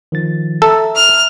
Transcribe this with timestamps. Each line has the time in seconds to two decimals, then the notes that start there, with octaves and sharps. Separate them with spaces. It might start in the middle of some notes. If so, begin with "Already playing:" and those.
0.12 D#3 F3 A6
0.62 A4 E5 A#5 E6
0.94 F6